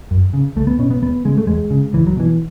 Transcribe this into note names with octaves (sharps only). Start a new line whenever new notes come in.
F#2
C#3
C#2 A3
B3
B2 C#4
B3
D#2 B3
C#3 G#3
A3
E2 G#3
C#3
C#2 E3
F#3
B2 E3